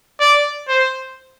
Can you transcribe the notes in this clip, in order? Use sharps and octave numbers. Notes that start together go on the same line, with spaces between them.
D5
C5